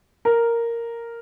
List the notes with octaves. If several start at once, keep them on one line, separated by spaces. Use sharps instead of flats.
A#4